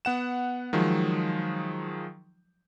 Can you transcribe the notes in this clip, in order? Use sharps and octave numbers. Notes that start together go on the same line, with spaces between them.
B3 F#5 E7
D#3 F3 F#3 G#3